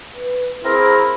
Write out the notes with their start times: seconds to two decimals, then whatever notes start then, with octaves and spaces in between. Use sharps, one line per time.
0.14 B4
0.64 C4 E4 G#4 A#4 C6